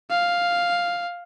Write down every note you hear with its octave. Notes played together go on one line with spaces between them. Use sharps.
F5